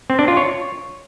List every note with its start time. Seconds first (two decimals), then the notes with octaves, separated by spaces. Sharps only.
0.10 C4
0.19 D4
0.28 F4
0.37 C#5